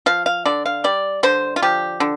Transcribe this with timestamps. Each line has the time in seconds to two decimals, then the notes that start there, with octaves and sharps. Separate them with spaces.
0.06 F3 F5
0.26 F5
0.45 D3 D5
0.66 F5
0.84 G3 D5
1.23 D3 C5
1.56 F4
1.62 F3 G4
2.00 D3